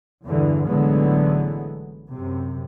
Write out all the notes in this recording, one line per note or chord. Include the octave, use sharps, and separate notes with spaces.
E2 G2 B2 D3 E3
A1 D3 E3 F#3 G#3 B3
F#2 C3